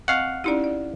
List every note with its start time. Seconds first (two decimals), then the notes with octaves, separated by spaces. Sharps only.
0.08 C4 D#5 F5 F#5 C#6
0.44 C#4 D#4 E4 G4 D5
0.64 D5